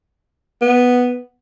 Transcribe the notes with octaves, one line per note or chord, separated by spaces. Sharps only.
B3